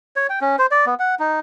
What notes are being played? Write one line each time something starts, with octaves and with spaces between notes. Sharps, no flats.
C#5
G5
C#4
C5
D5
B3
F#5
D#4